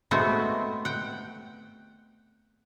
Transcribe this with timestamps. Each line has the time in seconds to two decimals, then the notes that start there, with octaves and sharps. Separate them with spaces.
0.11 G#3 A3 B3 C4 F#4
0.85 F#5 G5